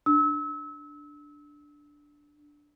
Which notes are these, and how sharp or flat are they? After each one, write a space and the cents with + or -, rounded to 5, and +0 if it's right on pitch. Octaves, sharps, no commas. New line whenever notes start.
D4 +0 E6 -30